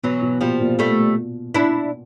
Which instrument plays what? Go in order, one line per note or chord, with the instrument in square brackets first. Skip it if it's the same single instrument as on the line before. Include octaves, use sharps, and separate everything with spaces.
[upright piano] B2 [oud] E3 F#3
[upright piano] B2
[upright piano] A#2 [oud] F3 G3
[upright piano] A#2
[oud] G3 A3
D4 E4